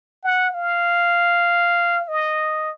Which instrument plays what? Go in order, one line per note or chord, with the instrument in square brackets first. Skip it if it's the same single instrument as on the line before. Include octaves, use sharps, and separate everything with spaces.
[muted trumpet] F#5
F5
D#5